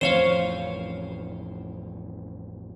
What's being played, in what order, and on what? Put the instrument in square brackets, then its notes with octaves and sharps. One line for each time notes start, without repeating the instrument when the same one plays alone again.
[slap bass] A1 F2 E3 [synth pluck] C5 C#5 F5